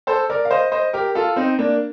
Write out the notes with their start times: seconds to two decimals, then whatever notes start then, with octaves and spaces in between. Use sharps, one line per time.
0.07 A4 C5
0.30 A#4 D5
0.45 F5
0.51 C5 D#5
0.72 C5 D#5
0.93 G4 A#4
1.15 F4 A4
1.36 C4 D#4
1.58 A#3 D4